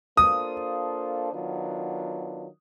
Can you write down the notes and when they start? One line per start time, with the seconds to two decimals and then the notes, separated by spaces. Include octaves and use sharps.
0.17 A#3 D4 F4 A4 C5 D#6
1.32 D#3 F#3 B3 D4 F4